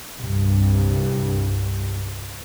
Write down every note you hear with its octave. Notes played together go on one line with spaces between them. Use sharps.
C2 G2